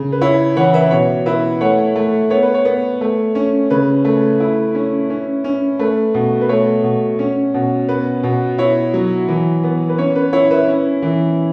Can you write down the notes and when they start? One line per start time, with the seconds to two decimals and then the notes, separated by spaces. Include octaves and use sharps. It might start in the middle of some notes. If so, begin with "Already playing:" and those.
Already playing: C#3
0.12 B4
0.21 E4 C#5
0.56 E3 C#5 F#5
0.74 B4 E5
0.91 B2 C#5
1.26 E4 B4 E5
1.61 A3 C#5 F#5
1.96 A3
2.30 B3 C#5
2.43 B4
2.54 C#5
2.65 B3
3.01 A3
3.35 C#4
3.70 C#3 B4
4.05 A3
4.40 E4
4.75 C#4
5.10 C#4
5.44 C#4
5.79 A3 B4
6.14 B2
6.41 B4
6.49 A3 C#5
6.84 B2
7.19 C#4
7.54 B2
7.89 B3 B4
8.23 B2
8.58 E4 C#5
8.94 F#3
9.28 E3
9.64 B3
9.89 B4
9.98 C#4 C#5
10.16 B4
10.33 E4 C#5
10.51 B4 E5
10.68 C#4
11.02 E3